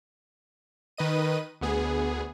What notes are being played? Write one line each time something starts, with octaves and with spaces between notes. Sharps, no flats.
D#3 B4 D#5 D#7
D2 B3 G#4